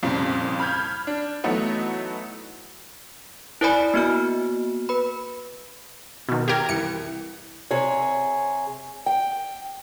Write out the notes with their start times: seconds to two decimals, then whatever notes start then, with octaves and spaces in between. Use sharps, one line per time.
0.03 C2 F2 A#2 C#3 G3
0.60 B5 F6 G6 G#6
1.07 D4
1.44 E3 F#3 A3 B3 D#4 F#4
3.61 E4 A#4 C5 D5 G#5 B5
3.94 A#3 B3 F#4 F6
4.89 B4 B5
6.29 B2 D#3
6.48 G4 A#4 G5 G#6
6.69 C2 E3 C#7
7.71 C3 G#4 C#5
9.06 G5